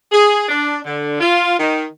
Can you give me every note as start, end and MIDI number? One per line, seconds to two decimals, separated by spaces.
0.11 0.45 68
0.49 0.79 62
0.84 1.18 50
1.20 1.55 65
1.58 1.85 51